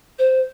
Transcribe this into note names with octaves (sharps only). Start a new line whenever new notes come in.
C5